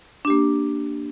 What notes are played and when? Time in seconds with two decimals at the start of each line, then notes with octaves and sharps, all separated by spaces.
0.25 D4
0.27 G4
0.30 A#3